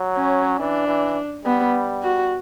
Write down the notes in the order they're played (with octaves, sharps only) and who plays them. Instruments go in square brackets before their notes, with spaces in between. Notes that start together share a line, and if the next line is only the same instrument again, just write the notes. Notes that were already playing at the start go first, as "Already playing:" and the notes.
Already playing: [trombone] F#3
[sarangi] C#4
[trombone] E3 [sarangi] D4
[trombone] E3
[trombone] G3 [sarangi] B3
[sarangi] F#4